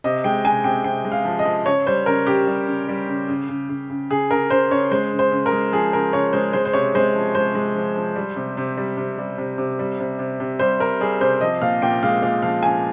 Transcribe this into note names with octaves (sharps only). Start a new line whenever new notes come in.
C3 D#5
G#3 G5
C3 G#5
C3 G5
C3 G5
G#3
F5
F3
D#5
F3
C#3 C#5
G3 C5
C#3 A#4
C#3 G4
G3
C#3
G3
C#3
C#3
C#3
C#3
C#3
C#3 G#4
C#3 A#4
C#3 C5
C#3 C#5
G#3 C5
C#3
C5
C#3
A#4
G#3
F3 G#4
C#3 A#4
C#3 C#5
G#3 C5
G#3 C5
C5
C3 C#5
G#3 C5
F3
G#3 C5
G#3
F3
F3
G3
C3
C3
G3
C3
G3
C3
C3
G3
C3
C3
C3
G3 C5
G3 A#4
G3 G#4
C3 C5
F3 D#5
A#2 F5
A#2 G5
G#3 F5
A#2 F5
F3 F5
F3 G#5